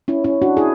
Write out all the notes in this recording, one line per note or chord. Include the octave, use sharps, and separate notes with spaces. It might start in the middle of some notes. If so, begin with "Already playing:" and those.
C#4 E4
C#4 E4
D4 F#4
E4 G#4